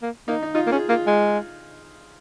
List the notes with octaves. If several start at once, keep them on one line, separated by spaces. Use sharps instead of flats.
A#3
A#3 D#4
D#4
D#4 F4
A#3
C#4 G#4
A#3 F4
G#3